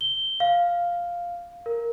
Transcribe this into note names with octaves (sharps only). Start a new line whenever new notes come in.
G7
F5
A#4